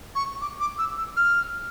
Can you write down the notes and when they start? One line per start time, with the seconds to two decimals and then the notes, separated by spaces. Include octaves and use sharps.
0.15 C#6
0.41 D6
0.60 D6
0.78 E6
0.98 E6
1.17 F6